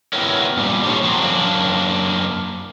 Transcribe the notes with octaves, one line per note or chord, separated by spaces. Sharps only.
B3 E4 F#4 G4 A#4 C#5
G2 A#2 G3
G4 A4 C5 C#5
F3 F#3 C4
F#2 A#3 D4